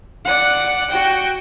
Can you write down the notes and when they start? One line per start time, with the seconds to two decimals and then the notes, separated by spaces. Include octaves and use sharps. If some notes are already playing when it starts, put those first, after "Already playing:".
0.25 D5 F#5
0.90 F#4 G5